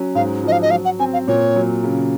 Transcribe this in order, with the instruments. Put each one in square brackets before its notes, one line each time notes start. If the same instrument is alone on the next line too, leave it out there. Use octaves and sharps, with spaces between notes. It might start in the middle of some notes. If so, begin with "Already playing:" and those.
Already playing: [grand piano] F#3 C#4
[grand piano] G#2 [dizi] F5
[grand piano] F3 [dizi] D#5
[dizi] F5
D#5
[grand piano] F#3 [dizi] F5
[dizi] F#5
[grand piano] C4 [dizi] G#5
[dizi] F5
[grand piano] A#2 [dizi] C#5
[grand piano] F#3
C#3